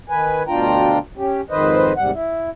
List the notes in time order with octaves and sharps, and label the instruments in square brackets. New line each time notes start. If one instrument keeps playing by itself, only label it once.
[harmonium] D#3 B4 G#5
D2 B2 D4 F4 G5 A#5
C#4 G4
F2 G#2 D#3 B4 C5 D#5
D#2 G#2 C3 G3 F#5
E4